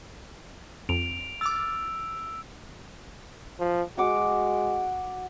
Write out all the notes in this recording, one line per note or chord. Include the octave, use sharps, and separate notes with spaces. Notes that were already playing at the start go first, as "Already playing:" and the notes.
F2 D7 F7
D6 E6 F6 A6
F3
G#3 F#4 F#5 D6